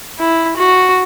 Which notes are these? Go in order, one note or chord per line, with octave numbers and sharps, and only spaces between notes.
E4
F#4